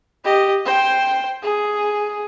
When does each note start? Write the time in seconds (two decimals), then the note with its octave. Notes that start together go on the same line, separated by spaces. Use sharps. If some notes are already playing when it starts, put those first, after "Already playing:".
0.24 G4 D#5
0.66 C5 G5
1.43 G#4